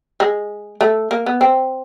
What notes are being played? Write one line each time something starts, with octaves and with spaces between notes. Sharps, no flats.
G#3
A3
A#3
B3
C4